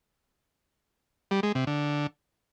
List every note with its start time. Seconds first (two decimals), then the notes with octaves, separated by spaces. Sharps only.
1.31 G3
1.43 G#3
1.55 C3
1.67 D3